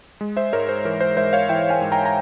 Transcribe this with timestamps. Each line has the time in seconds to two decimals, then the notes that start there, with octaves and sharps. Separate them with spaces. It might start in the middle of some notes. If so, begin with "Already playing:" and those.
0.21 G#3
0.37 C5 E5
0.53 G#2 A#4 C#5
0.69 C5
0.85 E3 A#4
1.00 C5
1.17 G#2 C5 E5
1.33 C#5 F5
1.49 E3 E5 G5
1.70 F5 G#5
1.81 G#2
1.92 G5 A#5
2.05 A#5